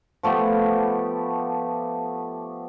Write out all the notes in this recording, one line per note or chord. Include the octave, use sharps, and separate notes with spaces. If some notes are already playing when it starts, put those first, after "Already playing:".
F3 A3 B3 G4